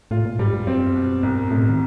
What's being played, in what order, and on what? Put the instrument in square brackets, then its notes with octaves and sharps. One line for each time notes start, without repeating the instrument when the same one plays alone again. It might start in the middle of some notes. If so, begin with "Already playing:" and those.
[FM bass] A2 [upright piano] F4
[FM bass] A#2
[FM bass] G#2 [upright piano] G3
[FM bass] G2
[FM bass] F#2 [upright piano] C4
[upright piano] B2
[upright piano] C2 [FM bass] G2
[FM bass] A2 [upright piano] C3
[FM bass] D#3